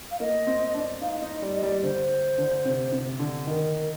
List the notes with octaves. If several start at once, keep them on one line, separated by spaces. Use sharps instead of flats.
F5
A#3 D#5
C4
D4
D#4 F5
D#4 D#5
G3 D5
D#5
G3 D5
D3 C5
D3
C3
C3
D3
D#3 A#4